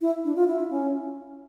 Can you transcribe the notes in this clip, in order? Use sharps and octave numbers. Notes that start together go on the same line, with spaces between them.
E4
D4
F4
E4
C#4